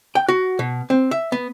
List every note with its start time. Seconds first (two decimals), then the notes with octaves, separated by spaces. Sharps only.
0.15 G5
0.28 F#4
0.59 B2
0.90 C4
1.11 E5
1.32 B3